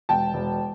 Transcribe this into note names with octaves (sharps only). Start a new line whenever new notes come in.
E1 G5 A5
E1